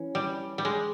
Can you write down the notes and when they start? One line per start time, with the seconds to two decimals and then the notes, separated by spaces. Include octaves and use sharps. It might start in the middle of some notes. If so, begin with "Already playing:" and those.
Already playing: E3 C#4
0.15 G3
0.58 G3
0.65 G#3